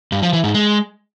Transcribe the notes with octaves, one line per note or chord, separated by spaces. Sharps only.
G2
F3
E3
G#2
G#3